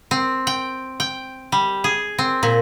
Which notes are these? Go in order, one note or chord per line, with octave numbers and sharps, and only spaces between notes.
C4
G5
G5
G3
G#4
C4
A#2